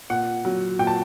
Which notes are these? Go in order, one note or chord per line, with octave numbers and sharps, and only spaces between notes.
A#2 F#5
F#3
A#2 G5
A5